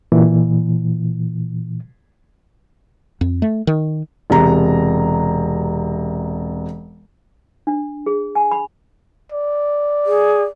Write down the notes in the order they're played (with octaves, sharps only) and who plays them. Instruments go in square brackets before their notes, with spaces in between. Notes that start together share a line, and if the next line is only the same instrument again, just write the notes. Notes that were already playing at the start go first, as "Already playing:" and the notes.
[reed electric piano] A#2 E3
[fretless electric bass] F2
A3
D#3
[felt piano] E1 C3 A#5
[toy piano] D4
G#4
G#5
B5
[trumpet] D5
[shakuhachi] G#4